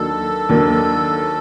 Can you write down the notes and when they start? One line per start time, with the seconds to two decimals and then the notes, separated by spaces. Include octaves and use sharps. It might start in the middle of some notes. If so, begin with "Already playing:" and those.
Already playing: D#2 D#3 F#3 A#3 D4 A4
0.49 D#2 D#3 F#3 A#3 D4